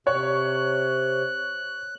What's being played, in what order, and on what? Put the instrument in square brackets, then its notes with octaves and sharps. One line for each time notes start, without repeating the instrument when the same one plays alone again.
[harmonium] C3 [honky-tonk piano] C#5 [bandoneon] F#6